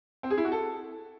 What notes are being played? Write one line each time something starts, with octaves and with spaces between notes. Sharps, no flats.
C4
G#4
E4
F#4
A4